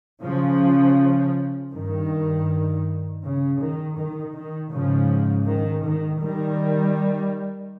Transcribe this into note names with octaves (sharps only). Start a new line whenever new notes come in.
C#3 F3
G2 D#3
C#3
D#3
D#3
D#3
G#2 C#3 F3
D#3
D#3
D#3 G3